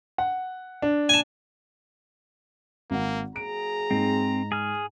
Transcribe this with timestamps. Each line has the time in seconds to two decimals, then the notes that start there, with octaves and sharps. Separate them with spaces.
0.18 F#5
0.82 D4
1.09 G#5 A5
2.91 G#1 A#3 F#5
3.36 F#3 A#3 G#4 A#5 D7
3.91 G#2 C4 D#4
4.52 G#4 F6